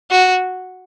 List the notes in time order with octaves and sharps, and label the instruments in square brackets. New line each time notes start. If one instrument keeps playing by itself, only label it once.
[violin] F#4